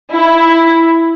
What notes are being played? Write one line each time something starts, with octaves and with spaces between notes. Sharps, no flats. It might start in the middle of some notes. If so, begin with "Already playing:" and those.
E4